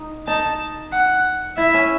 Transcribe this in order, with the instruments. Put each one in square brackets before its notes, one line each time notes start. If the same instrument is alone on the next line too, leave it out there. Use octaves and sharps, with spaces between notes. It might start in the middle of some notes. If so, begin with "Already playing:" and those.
Already playing: [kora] D#4
[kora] D#4 [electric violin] A5
[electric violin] F#5
[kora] E4 [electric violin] E5
[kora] C#4